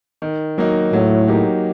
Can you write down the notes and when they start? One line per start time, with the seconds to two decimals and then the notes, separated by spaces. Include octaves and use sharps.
0.22 D#3
0.58 F#3 A#3 D#4
0.93 A2 F#3
1.28 A#3 D#4 G4